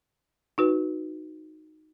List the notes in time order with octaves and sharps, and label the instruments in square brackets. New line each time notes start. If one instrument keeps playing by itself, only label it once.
[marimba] D#4 F#4 B4